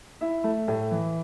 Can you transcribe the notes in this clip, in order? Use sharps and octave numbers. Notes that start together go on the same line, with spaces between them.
E4 E5
A3
A2
E3